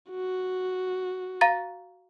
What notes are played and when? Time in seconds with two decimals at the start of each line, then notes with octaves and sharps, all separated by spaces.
0.10 F#4
1.41 F5 A#5 A6